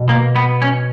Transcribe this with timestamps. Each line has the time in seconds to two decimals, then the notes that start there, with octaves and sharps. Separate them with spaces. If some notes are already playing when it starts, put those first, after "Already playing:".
Already playing: B2
0.09 A#3
0.36 B3
0.62 C#4